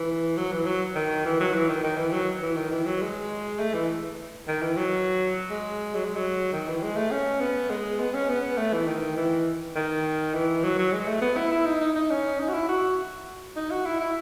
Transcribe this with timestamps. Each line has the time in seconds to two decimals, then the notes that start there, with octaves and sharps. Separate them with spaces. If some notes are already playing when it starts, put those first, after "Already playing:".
Already playing: E3
0.37 F#3
0.52 E3
0.66 F#3
0.95 D#3
1.25 E3
1.40 F#3
1.54 E3
1.69 D#3
1.83 D#3
1.98 E3
2.13 F#3
2.42 E3
2.56 D#3
2.72 E3
2.86 F#3
3.01 G#3
3.59 A3
3.74 E3
4.47 D#3
4.62 E3
4.77 F#3
5.50 G#3
5.94 F#3
6.05 G#3
6.16 F#3
6.52 D#3
6.68 E3
6.82 G#3
6.97 A3
7.11 C#4
7.40 B3
7.70 G#3
8.00 B3
8.14 C#4
8.29 B3
8.57 A3
8.73 E3
8.87 D#3
9.17 E3
9.76 D#3
10.34 E3
10.64 F#3
10.78 F#3
10.93 G#3
11.07 A3
11.21 B3
11.36 E4
11.51 E4
11.66 D#4
11.80 D#4
11.95 D#4
12.10 C#4
12.39 D#4
12.49 F#4
12.53 E4
12.68 F#4
13.56 D#4
13.71 F#4
13.86 E4
14.00 E4